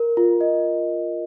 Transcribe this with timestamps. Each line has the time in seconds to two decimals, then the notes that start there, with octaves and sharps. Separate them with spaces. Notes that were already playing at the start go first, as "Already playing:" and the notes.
Already playing: A#4
0.17 F4
0.41 D#5